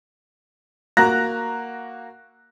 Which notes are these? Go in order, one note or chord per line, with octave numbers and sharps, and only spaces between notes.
A#3 F#4 A#5 F#6 A#6